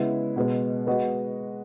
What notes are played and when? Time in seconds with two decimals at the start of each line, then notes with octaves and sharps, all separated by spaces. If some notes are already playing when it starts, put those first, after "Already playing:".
Already playing: C#3 G#3 B3 E4
0.36 B2 G#3 B3
0.87 G#3 B3 F#4 B4 D#5